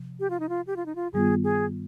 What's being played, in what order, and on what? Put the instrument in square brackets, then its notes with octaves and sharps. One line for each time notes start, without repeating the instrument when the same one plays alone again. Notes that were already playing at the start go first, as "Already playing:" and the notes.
Already playing: [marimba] C3 F3
[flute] G4
F4
D#4
F4
G4
F4
D#4
F4
[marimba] G2 D#3 G3 B3 F4 [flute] G#4
[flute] G#4